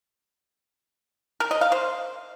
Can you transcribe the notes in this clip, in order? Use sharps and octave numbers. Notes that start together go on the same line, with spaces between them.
A#4
D#5
F5
C5